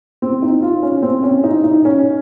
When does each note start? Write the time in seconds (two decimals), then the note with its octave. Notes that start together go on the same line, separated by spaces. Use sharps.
0.22 C4
0.42 D#4
0.62 F4
0.83 C#4
1.03 C4
1.23 C#4
1.44 D#4
1.64 D#4
1.85 C#4